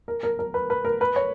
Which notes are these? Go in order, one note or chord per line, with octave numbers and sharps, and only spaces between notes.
A#4
A#4
A#4
B4
B4
A#4
B4
C#5